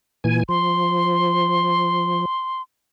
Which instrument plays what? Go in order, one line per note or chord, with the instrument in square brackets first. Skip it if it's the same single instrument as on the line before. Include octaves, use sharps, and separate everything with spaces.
[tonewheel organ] A#2 E3 G#5
[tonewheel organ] F3 [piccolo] C6